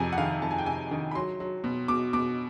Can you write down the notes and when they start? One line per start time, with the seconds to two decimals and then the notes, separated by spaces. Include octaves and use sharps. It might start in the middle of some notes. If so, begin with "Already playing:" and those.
Already playing: F2 C3 G#5
0.12 F#5
0.18 D#3 F5
0.42 F2 A5
0.51 G#5
0.58 G5
0.66 C3 G#5
0.91 D#3
1.11 B5
1.15 F#3 C6
1.40 F#3
1.64 B2
1.88 B2 D6
2.13 B2 D6